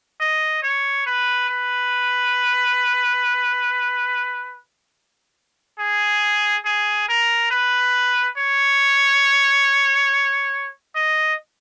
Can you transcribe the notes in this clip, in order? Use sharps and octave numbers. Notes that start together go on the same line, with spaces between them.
D#5
C#5
B4
B4
G#4
G#4
A#4
B4
C#5
D#5